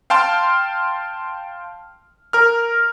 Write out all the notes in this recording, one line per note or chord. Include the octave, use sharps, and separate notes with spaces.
F5 G5 A5 C6 F6
A#4 F6